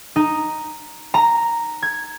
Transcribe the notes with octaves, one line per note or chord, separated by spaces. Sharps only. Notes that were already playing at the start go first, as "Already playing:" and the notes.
D#4
A#5
G#6